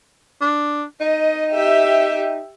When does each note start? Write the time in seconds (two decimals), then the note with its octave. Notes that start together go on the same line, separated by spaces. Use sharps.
0.41 D4
1.01 D#4 D#5
1.51 G4 E5